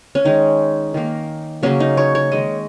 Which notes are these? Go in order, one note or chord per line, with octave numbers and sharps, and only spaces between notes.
C#4
D#3 G#3 D#4
D#3 A#3
C#3 F#3 A#3 C#4
D#4
C#5
C#5
D#3 G#3 D#5